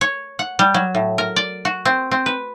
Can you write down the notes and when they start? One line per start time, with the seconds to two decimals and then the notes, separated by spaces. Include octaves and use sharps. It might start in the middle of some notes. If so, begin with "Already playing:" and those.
0.01 C#5
0.39 F#5
0.59 G3
0.74 F#3
0.95 A2
1.18 A#4
1.36 D5
1.65 F#4
1.85 C4
2.11 C4
2.26 B4